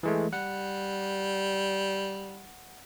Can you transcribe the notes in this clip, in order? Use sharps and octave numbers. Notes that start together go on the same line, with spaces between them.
E3 G#3 A3
G3 F#5